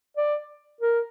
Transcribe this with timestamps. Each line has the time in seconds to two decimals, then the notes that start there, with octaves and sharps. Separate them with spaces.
0.17 D5
0.81 A#4